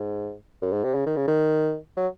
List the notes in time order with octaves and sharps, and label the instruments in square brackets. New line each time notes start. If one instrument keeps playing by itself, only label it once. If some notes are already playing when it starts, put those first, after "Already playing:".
Already playing: [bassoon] G#2
F#2
G#2
C3
C#3
D#3
C#3
D#3
F#3